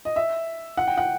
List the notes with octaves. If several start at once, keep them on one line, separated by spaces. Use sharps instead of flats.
D#5
E5
F#5
G5
F#5